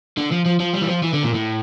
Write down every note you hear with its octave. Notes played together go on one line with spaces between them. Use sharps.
D3
F3
F3
F3
G3
E3
F3
E3
D3
A#2
A2